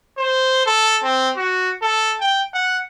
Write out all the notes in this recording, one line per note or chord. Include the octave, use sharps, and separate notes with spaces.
C5
A4
C4
F#4
A4
G5
F#5